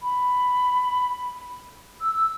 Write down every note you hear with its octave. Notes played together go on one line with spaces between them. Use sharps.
B5
E6
E6